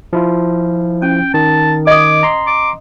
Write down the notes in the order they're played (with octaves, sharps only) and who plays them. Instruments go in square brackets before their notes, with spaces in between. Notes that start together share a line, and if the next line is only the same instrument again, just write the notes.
[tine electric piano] F3 E4 F4
[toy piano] C#4 [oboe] G5
[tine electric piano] D#3 [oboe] A5
[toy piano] D#5 D#6 [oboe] D6
[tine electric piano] A#5 C6
[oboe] D6